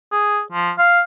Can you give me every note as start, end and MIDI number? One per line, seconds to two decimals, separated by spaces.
0.12 0.41 68
0.52 0.71 53
0.78 1.01 77